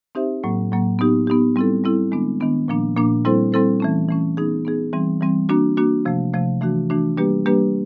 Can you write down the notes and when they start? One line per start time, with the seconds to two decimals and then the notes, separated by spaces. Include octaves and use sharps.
0.15 C4 D#4 G4 C5 E5
0.44 A2 F#3 A#3
0.72 A2 F#3 A#3
0.99 B3 D#4 G4
1.27 B3 D#4 G4
1.56 G3 C4 E4 A4
1.84 G3 C4 E4 A4
2.11 D#3 G#3 B3 D4
2.40 D#3 G#3 B3 D4
2.68 A#2 F3 A#3 D4
2.97 A#2 F3 A#3 D4
3.25 G3 C4 E4 A4 C5
3.52 G3 C4 E4 A4 C5
3.80 E3 A3 C#4
4.09 E3 A3 C#4
4.37 B3 D#4 G#4
4.65 B3 D#4 G#4
4.93 E3 G3 C4
5.21 E3 G3 C4
5.49 A#3 D4 F#4
5.77 A#3 D4 F#4
6.05 C3 F3 A3
6.33 C3 F3 A3
6.61 E3 A3 D4 F#4
6.90 E3 A3 D4 F#4
7.17 G3 A#3 D4 G4 B4
7.46 G3 A#3 D4 G4 B4